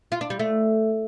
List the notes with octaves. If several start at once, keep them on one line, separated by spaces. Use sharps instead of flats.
F4
D4
G3
A3